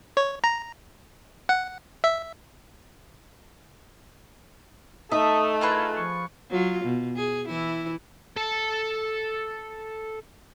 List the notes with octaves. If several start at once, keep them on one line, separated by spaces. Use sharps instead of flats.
C#5
A#5
F#5
E5
A3 D#4 A4 E5 A5 D#6
E4 F4 G#4 A#4 B4
F3 C#6
F#3 F4
B2
G#4
E3 E4
A4 A5